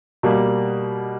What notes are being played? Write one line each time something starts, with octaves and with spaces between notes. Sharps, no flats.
B2 G3 A#3